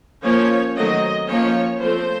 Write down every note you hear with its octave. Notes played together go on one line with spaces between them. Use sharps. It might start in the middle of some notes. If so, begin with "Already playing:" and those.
F3 A#3 C#4 C#5
D#3 F#3 A3 C4 D#5
F3 A#3 C#4 C#5
F3 A3 C4 C5